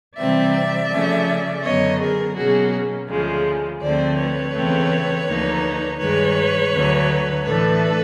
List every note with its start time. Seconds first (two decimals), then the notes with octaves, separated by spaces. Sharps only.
0.17 C3 E3 G3 C4 D5 E5
0.90 C#3 F3 A3 C#4
1.63 F#2 D3 F#3 B3 C#5 D#5
2.00 G#4 A#4
2.36 B2 F#3 A#3 C#4 F#4 G#4
3.09 D2 C#3 F3 G#3
3.81 D2 D3 F3 A3 C4 C5 D5
4.18 B4 C#5
4.54 E2 C#3 E3 A3 C4
5.27 D2 D3 F3 A#3 D#4
6.00 G2 D#3 G#3 B4 C#5
6.72 D2 D3 F#3
7.45 A2 E3 A3 D4 A4 B4